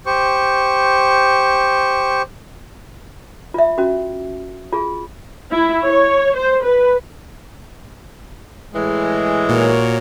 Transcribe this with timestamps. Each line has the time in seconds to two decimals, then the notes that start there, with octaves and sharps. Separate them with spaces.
0.06 G4 C5 C#6
3.54 F4 E5
3.78 C#4 F#4
4.73 F4 G#4
5.52 E4
5.86 C#5
6.36 C5
6.65 B4
8.74 A2 E3 G#3
9.49 A#2 F#4 A#4 C#5